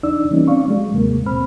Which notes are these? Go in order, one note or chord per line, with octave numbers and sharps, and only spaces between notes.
E2 D4 D#4 D5 E6
E3 G3 A#3 C4 C#4 D#4
C4 C#4 D5 F5 C#6
F#3 G#3
D#2 G#2 C3 G#3 A#3
D#2 B2 C4 C5 B5 F6